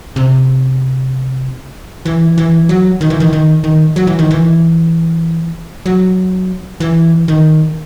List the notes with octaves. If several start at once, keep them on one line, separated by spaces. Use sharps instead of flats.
C3
E3
E3
F#3
D#3
E3
D#3
D#3
D#3
F#3
E3
D#3
E3
F#3
E3
D#3